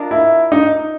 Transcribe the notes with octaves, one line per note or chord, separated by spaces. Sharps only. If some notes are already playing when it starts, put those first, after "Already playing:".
Already playing: D4 F4 A#4 D#5
E4
D#4